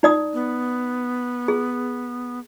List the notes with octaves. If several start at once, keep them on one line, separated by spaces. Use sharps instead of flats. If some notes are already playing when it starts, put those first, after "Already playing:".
D#4 D5 D#6
B3
G#4